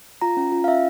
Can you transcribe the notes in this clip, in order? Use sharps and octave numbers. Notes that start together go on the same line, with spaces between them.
F4 A#5
C#4
F4
F5
C#4 E5